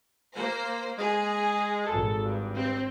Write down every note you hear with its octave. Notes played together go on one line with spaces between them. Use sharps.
A#3 C5
G#3 G#4
G#1 A4
G2
C4